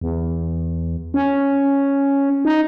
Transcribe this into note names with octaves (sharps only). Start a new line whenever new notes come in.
E2
C#4
D#4